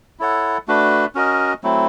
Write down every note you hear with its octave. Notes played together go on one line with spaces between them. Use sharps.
E4 A4 C#5 F#5
A3 D4 F#4 B4
C#4 F#4 A#4 D#5
F#3 A3 C4 E4